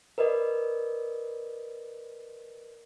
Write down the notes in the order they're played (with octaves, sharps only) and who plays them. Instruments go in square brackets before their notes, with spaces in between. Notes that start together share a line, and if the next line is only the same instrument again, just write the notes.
[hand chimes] A#4 B4 D5 D#5